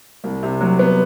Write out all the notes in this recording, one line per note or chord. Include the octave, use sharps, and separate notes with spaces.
C2
C3
F#3
B3